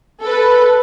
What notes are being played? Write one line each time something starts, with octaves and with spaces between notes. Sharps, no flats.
A4 B4